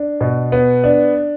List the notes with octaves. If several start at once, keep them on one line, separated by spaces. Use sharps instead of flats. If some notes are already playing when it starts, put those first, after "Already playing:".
Already playing: D4
B2
B3
D4